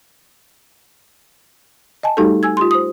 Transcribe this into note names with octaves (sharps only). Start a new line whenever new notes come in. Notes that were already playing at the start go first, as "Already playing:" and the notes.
D#5 G#5 A5
G3 A3 D#4 F#4 G4 A4
G#5 E6 G#6
F4 G4 C6
C5 D#6